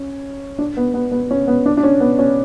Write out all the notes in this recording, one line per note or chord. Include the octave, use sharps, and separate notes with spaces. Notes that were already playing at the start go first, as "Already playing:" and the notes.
Already playing: C#4
D4
B3
B3
B3
C#4
B3
D4
D4
C#4
B3
C#4